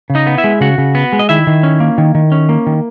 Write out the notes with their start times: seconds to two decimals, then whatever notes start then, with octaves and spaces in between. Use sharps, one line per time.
0.10 C#3
0.15 D#4 D#5
0.27 B3
0.38 E4 E5
0.44 G#3
0.61 C#3 F#4 F#5
0.78 C#3
0.95 B3
1.13 G#3
1.19 D#5
1.29 D#3 E4 E5
1.47 D#3
1.63 C#4
1.80 A#3
1.98 D#3
2.15 D#3
2.32 C#4
2.49 A#3
2.67 D#3